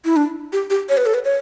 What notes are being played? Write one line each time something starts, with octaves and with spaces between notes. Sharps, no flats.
E4
D4
G4
G4
C#5
B4
A4
B4
C#5